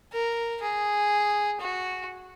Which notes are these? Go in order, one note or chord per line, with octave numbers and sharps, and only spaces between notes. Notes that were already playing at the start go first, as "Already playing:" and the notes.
A#4
G#4
F#4